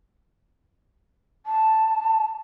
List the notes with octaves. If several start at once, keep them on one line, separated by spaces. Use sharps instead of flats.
A5